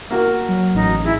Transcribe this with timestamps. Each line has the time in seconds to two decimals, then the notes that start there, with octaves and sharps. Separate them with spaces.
0.11 A#3 F#4 A#4
0.49 F#3
0.75 A1 D#4
1.04 E4 G#4